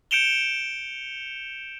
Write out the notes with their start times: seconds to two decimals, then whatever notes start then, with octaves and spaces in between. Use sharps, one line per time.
0.11 G6 C#7 D7 E7 F7 G7